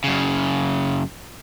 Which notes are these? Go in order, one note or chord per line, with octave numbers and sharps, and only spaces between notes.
F#2 C#3